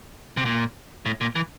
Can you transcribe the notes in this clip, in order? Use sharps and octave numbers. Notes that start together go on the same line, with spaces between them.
C3
A#2
A2
A#2
E3